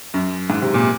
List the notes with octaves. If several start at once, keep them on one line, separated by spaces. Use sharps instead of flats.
F#2
G#2
C3
A#2